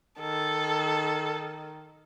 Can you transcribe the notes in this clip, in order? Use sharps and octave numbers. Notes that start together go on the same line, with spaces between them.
D#3 A4